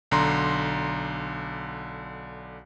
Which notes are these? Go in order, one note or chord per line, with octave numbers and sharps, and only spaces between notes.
B1 D3 A#5 C6